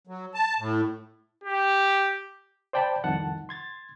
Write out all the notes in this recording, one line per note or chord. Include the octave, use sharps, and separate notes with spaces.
F#3
A5
A2
G4
C5 D5 G5 A5 B5
C2 F2 D#3 F#5 A5
C6 G#6 A6